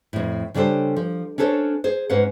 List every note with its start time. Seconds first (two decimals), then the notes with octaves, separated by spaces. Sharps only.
0.13 F2 A2
0.54 C#3 G3 D4 A4 C5
0.96 F3
1.38 C#4 D4 A4 C5 C#5
1.84 G#4 C5
2.10 G#2 C#4 B4 C5 F#5